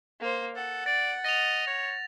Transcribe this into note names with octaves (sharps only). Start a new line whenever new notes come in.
A#3 C5
A4 F#5
D5 A6
D#5 A#6 F7
C#5